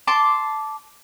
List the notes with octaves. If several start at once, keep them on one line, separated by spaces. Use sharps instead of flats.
A5 C6 D6